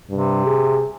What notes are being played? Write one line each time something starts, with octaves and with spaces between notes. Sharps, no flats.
G2 C3
G#4